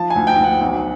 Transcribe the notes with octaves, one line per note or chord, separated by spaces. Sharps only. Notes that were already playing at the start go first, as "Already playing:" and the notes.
Already playing: F3 A5
D2 G#5
G5
D2
F#5
B1